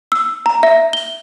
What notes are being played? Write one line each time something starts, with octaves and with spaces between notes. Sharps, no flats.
E6
A#5
E5
G7